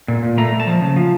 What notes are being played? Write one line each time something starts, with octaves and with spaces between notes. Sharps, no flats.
A#2
A#2
A3 A#5
A3
A5
F3
C#3
F3